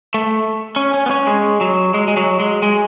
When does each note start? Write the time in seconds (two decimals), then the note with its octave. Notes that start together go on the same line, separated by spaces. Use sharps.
0.14 A3
0.76 C#4
0.94 C#4
1.06 B3
1.11 C#4
1.27 G#3
1.61 F#3
1.94 G#3
2.08 G#3
2.17 F#3
2.40 G#3
2.62 G#3